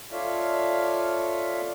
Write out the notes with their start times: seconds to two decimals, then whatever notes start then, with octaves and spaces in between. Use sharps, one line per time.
0.12 F4 A4 C#5 D5 E5 F5